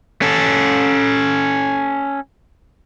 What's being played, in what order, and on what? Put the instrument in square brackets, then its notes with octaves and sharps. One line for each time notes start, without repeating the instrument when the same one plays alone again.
[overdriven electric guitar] C#4 A4